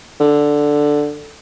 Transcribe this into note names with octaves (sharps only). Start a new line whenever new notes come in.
D3